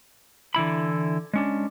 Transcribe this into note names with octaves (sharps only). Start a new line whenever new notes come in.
D3 E3 E4 B5
G#3 C#4 D4